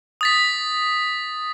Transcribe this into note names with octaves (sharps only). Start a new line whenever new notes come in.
D#6 A6 B6